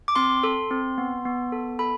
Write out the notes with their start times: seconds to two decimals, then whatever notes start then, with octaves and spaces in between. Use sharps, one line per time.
0.08 D6
0.16 C4 C6
0.43 A4
0.71 C4
0.98 B3
1.25 B3
1.52 A4
1.79 A4 B5